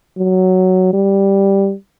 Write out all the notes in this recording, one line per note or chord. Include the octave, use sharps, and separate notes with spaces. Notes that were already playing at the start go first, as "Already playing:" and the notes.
F#3
G3